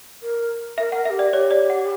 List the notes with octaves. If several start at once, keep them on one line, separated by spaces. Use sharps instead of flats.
A#4
A#4 E5
A#4 F#5
G4 A#4 E5
D5
G4 C#5
D5
F#5